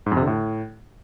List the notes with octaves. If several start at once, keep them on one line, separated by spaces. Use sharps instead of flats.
G#2
F2
C3
D3
A2